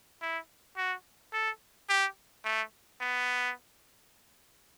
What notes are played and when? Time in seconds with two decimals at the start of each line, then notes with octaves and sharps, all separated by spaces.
0.22 E4
0.77 F#4
1.33 A4
1.89 G4
2.45 A3
3.01 B3